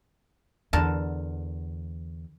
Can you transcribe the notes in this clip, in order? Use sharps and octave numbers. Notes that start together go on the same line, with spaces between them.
E2 D3 A#4 A5